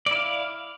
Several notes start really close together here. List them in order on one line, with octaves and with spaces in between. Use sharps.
D5 E4 F5